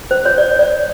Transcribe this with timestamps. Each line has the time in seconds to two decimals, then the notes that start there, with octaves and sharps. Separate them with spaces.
0.11 C5
0.26 C#5
0.38 D5
0.59 D5